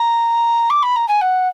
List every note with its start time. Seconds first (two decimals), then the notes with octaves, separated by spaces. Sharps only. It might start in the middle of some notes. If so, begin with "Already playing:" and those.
Already playing: A#5
0.70 D6
0.83 B5
0.96 A#5
1.08 G#5
1.21 F#5